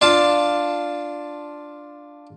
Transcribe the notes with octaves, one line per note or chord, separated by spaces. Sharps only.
D4 F4 F5 A5